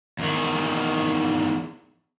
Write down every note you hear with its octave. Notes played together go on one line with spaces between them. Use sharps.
E2 D#3